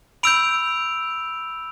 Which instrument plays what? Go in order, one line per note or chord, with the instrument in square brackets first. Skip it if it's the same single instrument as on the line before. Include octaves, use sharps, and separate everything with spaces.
[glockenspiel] B5 E6 G6 D7 F7